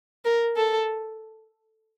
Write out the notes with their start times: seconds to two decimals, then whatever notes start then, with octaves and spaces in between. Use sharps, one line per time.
0.25 A#4
0.57 A4